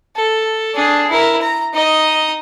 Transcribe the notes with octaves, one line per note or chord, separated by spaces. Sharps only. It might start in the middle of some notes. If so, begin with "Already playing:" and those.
A4
D4 G#4
E4 A#4
A#5
D#4 D#5